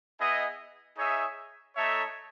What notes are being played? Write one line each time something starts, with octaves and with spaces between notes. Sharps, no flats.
B3 E4 G#4 D#5
D#4 G#4 C#5 E5
A3 D#4 A4 C#5 E5